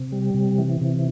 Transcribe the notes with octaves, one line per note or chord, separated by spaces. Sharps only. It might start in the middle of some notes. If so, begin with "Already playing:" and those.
Already playing: C3
G3
C3
E3
C3